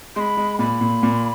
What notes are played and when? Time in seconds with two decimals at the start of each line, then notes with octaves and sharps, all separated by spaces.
0.16 G#3 B5 C6
0.37 G#3
0.59 A#2 B5
0.81 A#2
1.03 A#2